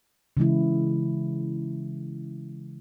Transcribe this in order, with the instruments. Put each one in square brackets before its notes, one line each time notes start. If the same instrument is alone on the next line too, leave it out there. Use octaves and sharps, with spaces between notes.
[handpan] C#3 E3 G#3 E4